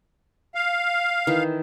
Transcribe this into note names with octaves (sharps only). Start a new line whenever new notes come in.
F5
D#3 E3